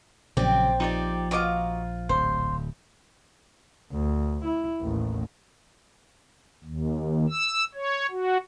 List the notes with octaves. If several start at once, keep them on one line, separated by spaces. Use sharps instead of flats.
A#1 C#3 F#3 C4 D5
F3 D#4 G4 D5
F4 F#4 D#5 A#5 D6
D1 C5
D2
E4
A1 D#2
D#2
E6
C#5
F#4